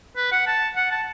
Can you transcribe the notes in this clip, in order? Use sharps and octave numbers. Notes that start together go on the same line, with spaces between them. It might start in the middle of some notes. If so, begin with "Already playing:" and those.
B4
F#5
A5
F#5
A5